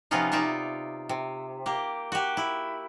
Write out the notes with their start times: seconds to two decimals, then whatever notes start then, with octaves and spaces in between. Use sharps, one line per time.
0.11 C3 F3 B3 C#4 D#4 F4
0.32 D#4 F4 D5 E5
1.09 C3
1.66 A#3 G4
2.12 F#4 G4
2.37 E4